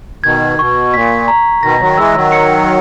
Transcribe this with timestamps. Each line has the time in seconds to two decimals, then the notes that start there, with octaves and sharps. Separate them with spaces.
0.24 B2 D#3 G#6
0.59 B2 C#6
0.93 A#2 B6
1.28 A#5
1.63 B2 D#3 A#6
1.80 D#3 F#3
1.97 E3 G#3 E6
2.14 D#3 F#3
2.32 C#7